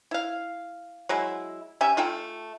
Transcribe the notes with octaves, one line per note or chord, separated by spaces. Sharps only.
E4 F5
F#3 G#3 E4
C#4 G4 E5 G#5
A3 F4 A4 G5